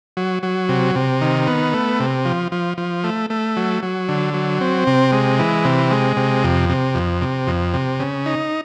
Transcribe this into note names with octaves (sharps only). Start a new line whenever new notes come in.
F#3
F#3
C3
C3
D#3
B3
A3
C3
F3
F3
F3
A3
A3
F#3
F#3
D3
F#3
C4
C3
G#3
E3
C3
G#3
C3
F2
C3
F2
C3
F2
C3
C#3
D#4